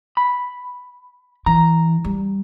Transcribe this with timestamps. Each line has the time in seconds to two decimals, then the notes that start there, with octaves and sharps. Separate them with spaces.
0.17 B5
1.46 E3 A#5
2.05 G3